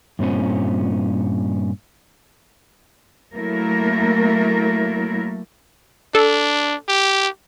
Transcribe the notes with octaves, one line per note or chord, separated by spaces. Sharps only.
G2 A#2 C4 C#4
F#3 A3 A#3 E4 A#4
D4 A4
G4